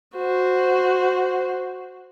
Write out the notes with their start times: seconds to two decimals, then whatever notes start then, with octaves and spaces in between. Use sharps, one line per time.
0.16 F#4 C5